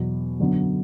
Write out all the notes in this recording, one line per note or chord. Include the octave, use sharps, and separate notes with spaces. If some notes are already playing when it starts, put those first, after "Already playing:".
Already playing: E2 B2 F#3
F#2 D3 F#3 B3